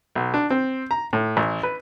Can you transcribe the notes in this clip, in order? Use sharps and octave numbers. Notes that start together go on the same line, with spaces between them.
B1
D4
C4
A#5
A2
A1
B4